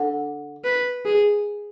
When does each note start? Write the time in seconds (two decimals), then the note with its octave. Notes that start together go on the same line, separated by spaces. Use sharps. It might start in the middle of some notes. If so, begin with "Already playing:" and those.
Already playing: D3
0.64 B4
1.05 G#4